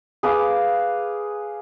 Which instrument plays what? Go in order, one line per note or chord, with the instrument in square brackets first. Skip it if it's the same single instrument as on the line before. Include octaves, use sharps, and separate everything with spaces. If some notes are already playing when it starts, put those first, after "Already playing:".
[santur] G#4 B4 F5 D6